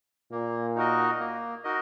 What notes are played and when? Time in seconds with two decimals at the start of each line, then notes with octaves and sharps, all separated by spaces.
0.32 A#2 A#3
0.76 D#4 F#4 A#4 D#5
1.20 A#3
1.64 D#4 F#4 A#4 D#5